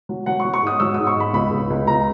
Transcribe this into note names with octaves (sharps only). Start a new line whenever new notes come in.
F#3
F#3 F#5
C#6
F#3
C#6
G#2 D#6
F#3 E6
G#2 D#6
C#6
G#2 B5
C#2 B5
C#2
C#2
C#2 A#5